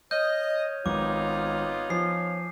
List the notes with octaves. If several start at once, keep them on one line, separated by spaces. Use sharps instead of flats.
C#5 D#5 F6 G6 D#7
G#1 B3 D#4 F4 D6
F3 G#5 C7